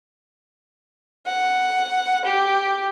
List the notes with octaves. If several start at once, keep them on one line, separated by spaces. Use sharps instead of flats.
F#5
G4